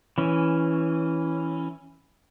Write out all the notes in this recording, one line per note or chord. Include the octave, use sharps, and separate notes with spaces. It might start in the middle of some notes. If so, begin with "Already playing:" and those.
E3 C#4